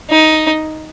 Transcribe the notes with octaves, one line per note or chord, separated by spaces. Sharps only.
D#4